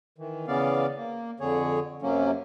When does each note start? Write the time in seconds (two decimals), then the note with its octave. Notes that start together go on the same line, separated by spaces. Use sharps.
0.18 D#3 E3
0.47 C#3 E3 B3 C#4 D5 F5
0.96 A#3
1.40 F2 D3 G#4 C#5
2.02 F#2 C3 F#3 A#3 C#4